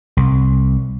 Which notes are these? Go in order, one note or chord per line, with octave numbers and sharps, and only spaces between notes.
C2